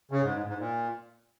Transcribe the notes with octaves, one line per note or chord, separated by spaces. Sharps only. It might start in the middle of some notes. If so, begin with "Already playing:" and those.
C#3
G#2
G#2
G#2
A#2